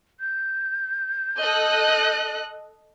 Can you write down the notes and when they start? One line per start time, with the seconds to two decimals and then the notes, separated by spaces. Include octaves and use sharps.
0.19 G6
1.39 A4 D#5 F#6